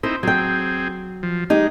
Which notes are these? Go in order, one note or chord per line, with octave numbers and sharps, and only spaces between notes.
C4 D#4 E4 C5
F#3 C4 G#4 G5
F3
G#3 D#4 G4